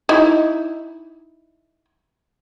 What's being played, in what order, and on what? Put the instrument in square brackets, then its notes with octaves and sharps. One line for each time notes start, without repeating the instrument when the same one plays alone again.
[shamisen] D#4 E4